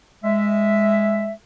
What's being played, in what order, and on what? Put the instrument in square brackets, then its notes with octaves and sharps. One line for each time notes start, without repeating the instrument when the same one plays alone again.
[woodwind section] G#3 E5